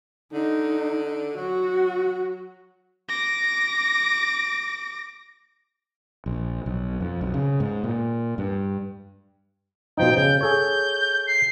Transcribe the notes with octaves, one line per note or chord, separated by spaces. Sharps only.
D3 D#4
F#3 F#4
D6 A#6
A#1
B1
F2
B1
C#3
G#2
A#2
G2
B2 F3 D#4 G5
C#3 G6
G#4 A4 C#5 G6
C7